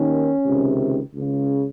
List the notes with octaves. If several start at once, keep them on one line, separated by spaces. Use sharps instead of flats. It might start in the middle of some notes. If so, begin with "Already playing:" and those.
Already playing: D#2 D#3 C#4
C#2 C3 D#3
C#2 C#3